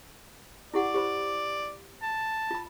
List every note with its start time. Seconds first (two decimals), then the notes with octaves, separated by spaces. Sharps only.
0.74 E4 G4 D5 F#5
0.94 G4 C5 B5
2.02 A5
2.51 F4 B5